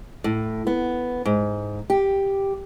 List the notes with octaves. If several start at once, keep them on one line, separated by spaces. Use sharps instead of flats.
A2
B3
G#2
G4